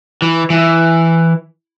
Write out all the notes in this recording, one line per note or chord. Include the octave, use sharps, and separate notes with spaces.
E3
E3